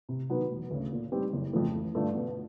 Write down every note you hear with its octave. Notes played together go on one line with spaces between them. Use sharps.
C3
D#3 F#3 B3
E1
D2 C#3
A#2
G3 C4 D#4 G4
F#1
F2 C#3 F3 A3
A1
G2 D3 F3 A3
B2